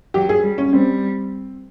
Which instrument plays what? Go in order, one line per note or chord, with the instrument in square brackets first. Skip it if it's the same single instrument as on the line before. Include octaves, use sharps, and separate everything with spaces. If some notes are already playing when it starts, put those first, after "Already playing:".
[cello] F#3 [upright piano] G4
[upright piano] G#4
[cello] G3
[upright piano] C#4
[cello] G3 [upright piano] C4